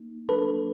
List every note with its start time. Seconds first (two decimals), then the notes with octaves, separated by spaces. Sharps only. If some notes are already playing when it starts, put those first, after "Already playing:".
Already playing: A#3 D#4
0.29 F#3 A#3 D4 F#4 A4 B4